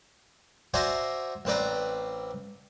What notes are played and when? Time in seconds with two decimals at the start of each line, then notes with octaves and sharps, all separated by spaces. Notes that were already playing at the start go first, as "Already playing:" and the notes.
0.74 F#4 C5 D5 E5 G#5 A#5
1.45 A1 C4 B4 D5 A#5